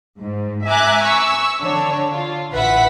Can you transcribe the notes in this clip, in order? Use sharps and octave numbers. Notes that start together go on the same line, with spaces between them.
G#2
E5 G#5 A#5 D6 F#6
C#6 E6
D3 D4 C#5
F4
A1 B4 E5 F#5 B5 B6